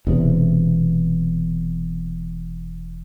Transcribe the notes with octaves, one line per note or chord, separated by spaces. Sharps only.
E1 E2 C3